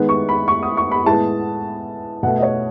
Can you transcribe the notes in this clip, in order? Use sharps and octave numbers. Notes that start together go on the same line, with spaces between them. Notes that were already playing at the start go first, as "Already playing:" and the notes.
Already playing: D#3 G#3 B3
C#6
B5
C#6
D#6
C#6
B5
A2 G#3 B3 A5
B2 A3 F#5
D#5
C#5